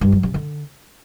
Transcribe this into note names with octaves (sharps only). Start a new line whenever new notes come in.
G2
F#3
C3
D3